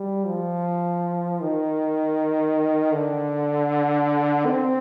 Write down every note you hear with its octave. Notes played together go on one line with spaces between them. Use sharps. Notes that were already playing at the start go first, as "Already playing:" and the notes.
Already playing: G3
F3
D#3
D3
C4